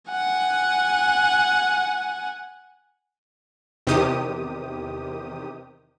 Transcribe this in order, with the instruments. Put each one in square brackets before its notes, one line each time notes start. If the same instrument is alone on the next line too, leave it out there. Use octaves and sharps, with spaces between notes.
[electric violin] F#5 G#5
[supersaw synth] E2 C3 D#3 G4 D#6